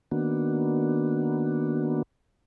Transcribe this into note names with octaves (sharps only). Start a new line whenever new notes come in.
D#3 A#3 B3 D4 F#4